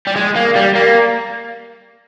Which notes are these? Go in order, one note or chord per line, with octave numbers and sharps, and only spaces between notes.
G3
G#3
A#3
G3
A#3